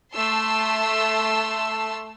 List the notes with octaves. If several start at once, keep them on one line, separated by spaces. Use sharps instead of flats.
A3 A5 C6 E6